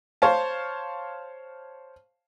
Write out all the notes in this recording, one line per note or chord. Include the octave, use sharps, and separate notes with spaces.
C5 C#5 F5 A5